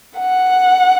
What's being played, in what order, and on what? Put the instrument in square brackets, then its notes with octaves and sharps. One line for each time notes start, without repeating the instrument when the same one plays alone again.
[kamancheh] F#5